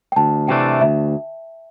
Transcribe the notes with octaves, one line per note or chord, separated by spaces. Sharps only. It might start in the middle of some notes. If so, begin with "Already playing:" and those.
G5
D2 A5
C3 E3 A3 D4 G5
D2 E5